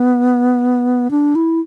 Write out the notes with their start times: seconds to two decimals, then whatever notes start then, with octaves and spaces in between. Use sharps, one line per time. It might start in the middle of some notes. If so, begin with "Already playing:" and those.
Already playing: B3
1.11 D4
1.35 E4